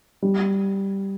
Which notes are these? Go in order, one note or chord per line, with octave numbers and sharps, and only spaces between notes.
G3